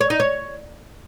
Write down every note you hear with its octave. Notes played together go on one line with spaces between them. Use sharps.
C#5
D#4
C#5